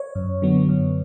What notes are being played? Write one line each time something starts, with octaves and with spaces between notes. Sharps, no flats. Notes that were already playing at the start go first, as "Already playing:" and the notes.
Already playing: C#5
F#2
D3 F#3 B3
F#2